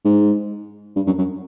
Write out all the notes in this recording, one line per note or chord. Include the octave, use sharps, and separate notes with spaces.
G#2
G2
F#2
F#2